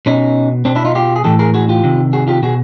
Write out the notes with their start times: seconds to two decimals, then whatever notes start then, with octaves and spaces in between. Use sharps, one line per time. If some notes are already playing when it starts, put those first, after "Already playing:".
0.06 B2 C#4 D#4
0.65 B2 C4 D4
0.75 D4 E4
0.85 D#4 F4
0.95 F4 G4
1.16 G#4
1.24 A2 E3 G4 A4
1.39 G#4 A#4
1.54 F#4 G#4
1.69 F4 G4
1.84 C3 D#3
2.13 F#4 G#4
2.28 F4 G4
2.43 B2 F#4 G#4